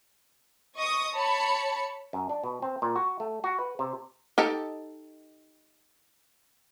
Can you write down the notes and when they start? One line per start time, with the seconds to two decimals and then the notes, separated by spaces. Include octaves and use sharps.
0.74 D#5 C#6 D#6
1.14 C#5 A5 B5 C#7
2.13 F#2
2.29 D4
2.44 B2
2.62 C4
2.82 A#2
2.96 F#4
3.20 A3
3.44 F#4
3.59 B4
3.79 C3
4.38 D#4 G4 A4